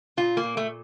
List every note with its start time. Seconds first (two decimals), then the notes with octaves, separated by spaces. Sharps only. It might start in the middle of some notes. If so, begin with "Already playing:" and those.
0.17 A#2 F4
0.37 A#3
0.43 A#2
0.57 A3